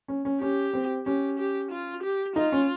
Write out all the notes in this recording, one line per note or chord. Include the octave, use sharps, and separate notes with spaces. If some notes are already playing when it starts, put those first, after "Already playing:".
C#4
C#4
C#4 G4
C4
C#4 G4
G4
F4
G4
D#4 F4
C#4